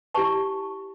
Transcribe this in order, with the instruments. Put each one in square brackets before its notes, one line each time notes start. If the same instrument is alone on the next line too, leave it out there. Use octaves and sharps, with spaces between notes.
[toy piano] E4 G4 B4 A5 C#6